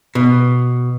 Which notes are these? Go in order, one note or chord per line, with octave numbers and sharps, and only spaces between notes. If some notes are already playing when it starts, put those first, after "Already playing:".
B2